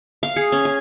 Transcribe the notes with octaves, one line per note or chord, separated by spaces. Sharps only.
F5
G#4
C#4
G#5